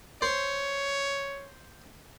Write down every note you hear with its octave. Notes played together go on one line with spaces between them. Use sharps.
C5 C#5